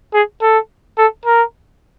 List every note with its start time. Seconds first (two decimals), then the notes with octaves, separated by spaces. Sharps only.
0.13 G#4
0.41 A4
0.98 A4
1.25 A#4